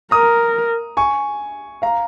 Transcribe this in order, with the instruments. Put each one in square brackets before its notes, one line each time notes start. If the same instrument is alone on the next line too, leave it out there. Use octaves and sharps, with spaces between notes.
[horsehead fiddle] A#4 [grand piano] A#5 D#6
[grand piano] G#5 C#6
F5 A#5